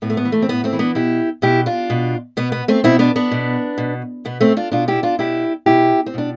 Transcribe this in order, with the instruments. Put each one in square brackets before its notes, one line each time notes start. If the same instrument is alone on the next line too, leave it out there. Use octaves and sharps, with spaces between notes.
[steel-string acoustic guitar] A2 B3
A3
B3
E3
A3
C4
A2 B3
A3 C4
E3
B3 D4
B2 E4 G4
B2 E4 G4
D4 F4
B2
B2 B3
B3
A3 C4
B2 C4 E4
B3 D4
B3 D4
B2
B2
B2 B3
A3 C4
D4 F4
B2 D4 F4
E4 G4
D4 F4
B2 E4 G4
B2 E4 G4
C4
B2 D4